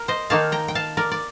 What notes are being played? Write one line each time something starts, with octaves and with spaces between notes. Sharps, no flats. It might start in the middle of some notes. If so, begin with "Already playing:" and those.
Already playing: A#4
C5 D#5
D#3 A#3 D#4 F5 A5
G5 A#5
G5
F5 A5
A#4 D5
D5